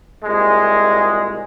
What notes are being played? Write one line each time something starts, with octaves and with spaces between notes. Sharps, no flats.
C2 A#2 G#3